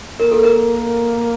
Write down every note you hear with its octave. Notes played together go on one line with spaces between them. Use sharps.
A#3 A#4
A4
A#4